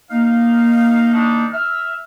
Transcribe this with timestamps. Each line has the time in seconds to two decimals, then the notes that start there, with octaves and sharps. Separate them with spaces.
0.11 A#3 D#4 F5
1.13 D#3 D4 D#4
1.53 E5 F6